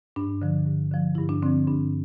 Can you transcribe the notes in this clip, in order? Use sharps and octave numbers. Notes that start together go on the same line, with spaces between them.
G2 D4
D3 F3
G2
D3 F3
G2 E4
D4
D3 F3 C4
G2 D4